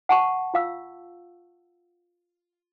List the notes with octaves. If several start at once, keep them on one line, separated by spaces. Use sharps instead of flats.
F#5 A5 C#6
F4 F5 E6